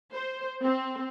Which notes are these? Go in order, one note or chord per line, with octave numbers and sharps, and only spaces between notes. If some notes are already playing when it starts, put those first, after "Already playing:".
C5
C4